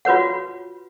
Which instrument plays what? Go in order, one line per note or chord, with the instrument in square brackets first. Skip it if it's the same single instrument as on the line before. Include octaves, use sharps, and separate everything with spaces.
[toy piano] F4 F#4 B4 C#5 F#5